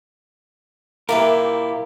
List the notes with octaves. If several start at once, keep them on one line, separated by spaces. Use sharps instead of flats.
A#2 A#3 E4 G4 A#4 B4 E5